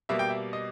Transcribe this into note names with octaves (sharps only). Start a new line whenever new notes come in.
B2 G3 A#3 E5
G5
E5
D#5